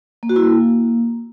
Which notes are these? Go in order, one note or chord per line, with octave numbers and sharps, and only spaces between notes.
A#3
F#4
E4
A#3